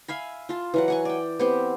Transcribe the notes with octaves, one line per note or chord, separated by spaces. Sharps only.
E5 F5 G#5 B5
F4 A5
E3 F#3 F#5
F#5 G#5 C#6
D5 G5
B3 C4 G4